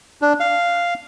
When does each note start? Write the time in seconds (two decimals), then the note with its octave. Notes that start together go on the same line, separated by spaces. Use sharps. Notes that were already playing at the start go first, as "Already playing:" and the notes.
0.22 D4
0.40 F5